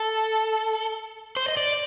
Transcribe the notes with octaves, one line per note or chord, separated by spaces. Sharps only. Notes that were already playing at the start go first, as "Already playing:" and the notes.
Already playing: A4
C5
D#5
D5